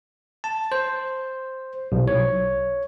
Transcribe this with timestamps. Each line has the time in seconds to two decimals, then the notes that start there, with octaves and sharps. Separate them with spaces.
0.44 A5
0.72 C5
1.92 B1
2.08 C#5